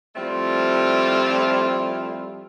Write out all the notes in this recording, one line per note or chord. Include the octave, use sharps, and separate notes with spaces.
F3 G3 A3 C4 E4 F4